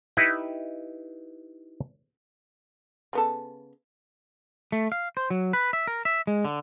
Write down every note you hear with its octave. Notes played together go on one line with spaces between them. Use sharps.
D#4 E4 G4 B4 E5
C#3 B3 A4
A3
F5
C5
F#3
B4
E5
A#4
E5
G#3
D3